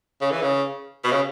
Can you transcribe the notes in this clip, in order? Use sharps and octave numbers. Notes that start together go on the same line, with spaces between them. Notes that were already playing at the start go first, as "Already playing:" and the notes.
C#3
E3
C#3
B2
C#3